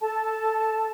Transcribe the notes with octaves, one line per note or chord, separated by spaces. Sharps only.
A4 A5